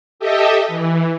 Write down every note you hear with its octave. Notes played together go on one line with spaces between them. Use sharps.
G4 A4 D#5 E5
E3